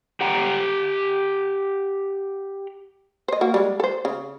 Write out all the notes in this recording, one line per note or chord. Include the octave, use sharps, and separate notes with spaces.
G4 F#5 G5 A#5
C5 D#5
A#3 F#4
G3 G#3
A4 C5
C#3